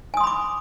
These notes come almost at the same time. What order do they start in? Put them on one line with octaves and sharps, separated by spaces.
G#5 D#6 C6 B5 D6